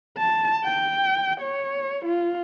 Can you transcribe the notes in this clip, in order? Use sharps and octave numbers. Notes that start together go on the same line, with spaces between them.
A5
G5
C#5
F4